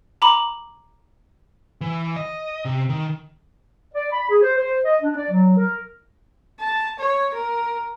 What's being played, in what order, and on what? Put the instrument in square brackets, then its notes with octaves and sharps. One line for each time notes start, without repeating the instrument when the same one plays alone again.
[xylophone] A#5 B5 D6 F#7
[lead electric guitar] E3
D#5
C3
D#3
[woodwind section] D5
B5
G#4
C5
C5
D#5
D4
D5
F#3
A#4
[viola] A5
C#5
A#4